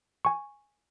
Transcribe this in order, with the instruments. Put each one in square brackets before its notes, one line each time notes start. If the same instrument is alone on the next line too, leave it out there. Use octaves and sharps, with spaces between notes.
[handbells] G#5 C#6